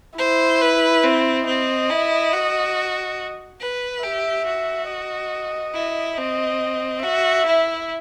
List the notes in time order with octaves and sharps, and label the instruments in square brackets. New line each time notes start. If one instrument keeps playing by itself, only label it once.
[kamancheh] E4 [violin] C5
[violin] B4
C4
[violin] C4 [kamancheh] D#5
[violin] E4
F#4
B4
[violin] G4 [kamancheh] E5
[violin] F#4
[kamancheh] D#5
[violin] E4
[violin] C4 [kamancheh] D#5
[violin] F#4 [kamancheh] E5
[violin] E4